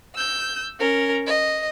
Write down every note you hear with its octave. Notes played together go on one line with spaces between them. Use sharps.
E6 G6
C#4 A#4
D#5